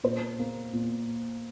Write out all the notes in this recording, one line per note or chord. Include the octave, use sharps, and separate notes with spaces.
A#2 C5
A#3
A#2